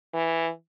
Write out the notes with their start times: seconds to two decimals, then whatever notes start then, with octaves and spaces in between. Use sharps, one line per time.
0.14 E3